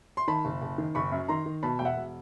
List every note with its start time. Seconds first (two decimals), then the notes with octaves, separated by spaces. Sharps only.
0.17 C6
0.28 D#3 A5 B5
0.45 F#1
0.62 F#1
0.78 D#3
0.95 F#1 B5 C#6
1.12 F#2
1.28 D#3 A#5 C6
1.46 D#3
1.63 B2 A5 B5
1.79 E1 G5
1.85 E5 F#5
1.96 E1